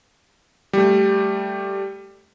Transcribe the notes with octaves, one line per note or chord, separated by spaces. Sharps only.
G3 A3